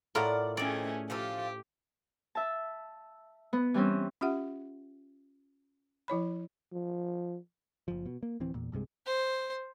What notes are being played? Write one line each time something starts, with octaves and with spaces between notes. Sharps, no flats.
A2 F4 A#4 D5 F#5
D#3 A3 C4 C#4 G#4 D5
F3 F4 G4 A4
E5 A5
B3
E3 G3 C4 C#4
C#4 F4 G4 E5 F#5
F3 E4 C#5 B5
F3
F#1 F3
B2
A#3
D1 E3 C4
E2 A#2
C2 G2 C3 G#3
C5